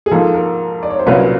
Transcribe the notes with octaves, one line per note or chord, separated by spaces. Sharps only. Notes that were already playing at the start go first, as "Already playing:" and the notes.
G#4
G#2 F3 A#3 A4
A#4
D5
C#5
C5
C2 A#2 F#3 A#3 C#4 B4